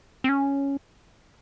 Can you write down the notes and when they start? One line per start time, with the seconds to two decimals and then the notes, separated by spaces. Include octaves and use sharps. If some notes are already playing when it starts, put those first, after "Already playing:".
0.24 C4
0.29 C#4